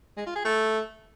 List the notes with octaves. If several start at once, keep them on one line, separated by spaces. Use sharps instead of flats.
G#3
F4
G#4
A3